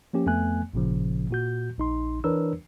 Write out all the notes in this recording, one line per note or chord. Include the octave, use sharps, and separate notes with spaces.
F3 A#3 C#4 G4
F2 A3 B3 G#5 F#6
G#1 A#2 C#3 F3
A#2 F#4 G6
A#1 D#4 C6
E3 D4 A#4 B4 C#5 E6